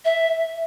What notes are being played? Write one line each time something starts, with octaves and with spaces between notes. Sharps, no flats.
E5